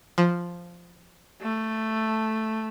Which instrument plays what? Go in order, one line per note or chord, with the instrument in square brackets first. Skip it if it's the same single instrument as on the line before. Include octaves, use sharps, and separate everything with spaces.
[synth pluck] F3
[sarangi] A3